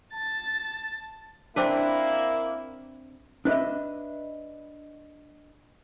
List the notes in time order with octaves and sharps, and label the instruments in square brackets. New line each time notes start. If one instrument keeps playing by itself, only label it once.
[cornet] A5 [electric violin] A6
[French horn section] A#3 E4 [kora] C4 D4 B4
[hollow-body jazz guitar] D4 B4 D#5 E5